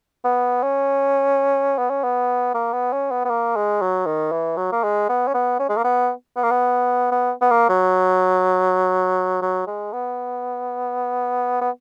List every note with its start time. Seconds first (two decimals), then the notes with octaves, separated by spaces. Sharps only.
0.24 B3
0.63 C#4
1.78 B3
1.90 C#4
2.04 B3
2.54 A#3
2.73 B3
2.93 C#4
3.11 B3
3.25 B3
3.30 A#3
3.56 G#3
3.82 F#3
4.06 D#3
4.32 E3
4.57 F#3
4.72 A#3
4.84 G#3
5.09 B3
5.28 C#4
5.34 B3
5.59 C#4
5.69 G#3
5.77 A#3
5.84 B3
6.36 B3
6.44 A#3
6.51 B3
7.12 B3
7.42 B3
7.51 A#3
7.69 F#3
9.42 F#3
9.67 G#3
9.93 B3
11.61 B3